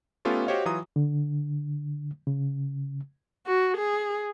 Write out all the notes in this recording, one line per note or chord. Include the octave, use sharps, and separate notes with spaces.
A3 B3 C#4 F4 G4 A4
F#4 G4 C5 C#5 D#5 F5
E3 F#3 F4 A#5 D#6
D3
C#3
F#4
G#4